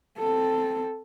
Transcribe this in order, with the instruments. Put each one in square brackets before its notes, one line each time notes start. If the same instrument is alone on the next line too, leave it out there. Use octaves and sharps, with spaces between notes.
[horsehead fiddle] C4 A4